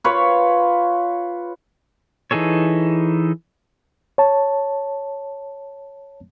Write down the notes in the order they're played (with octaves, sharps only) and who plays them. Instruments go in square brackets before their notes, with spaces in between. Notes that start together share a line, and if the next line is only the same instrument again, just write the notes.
[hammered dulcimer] F4 B4 C#5
[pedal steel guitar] E3 D#4 G#4 A4 C#5
[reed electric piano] C#5 A5